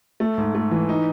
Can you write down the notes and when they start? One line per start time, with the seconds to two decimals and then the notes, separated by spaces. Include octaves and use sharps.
0.20 A3
0.38 G#2
0.55 A3
0.71 E3
0.89 D#4